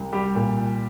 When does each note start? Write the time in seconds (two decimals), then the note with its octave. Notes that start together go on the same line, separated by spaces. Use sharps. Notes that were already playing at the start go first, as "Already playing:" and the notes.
Already playing: C2
0.12 G3 G4
0.35 A#2